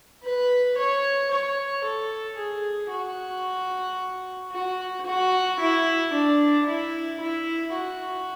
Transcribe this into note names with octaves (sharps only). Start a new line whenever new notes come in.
B4
C#5
C#5
A4
G#4
F#4
F#4
F#4
E4
D4
E4
E4
F#4